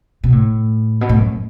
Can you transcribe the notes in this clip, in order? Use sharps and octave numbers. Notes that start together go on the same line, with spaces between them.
B2
A2
B2
A2
F#2